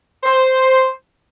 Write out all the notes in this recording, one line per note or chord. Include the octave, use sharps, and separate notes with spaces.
C5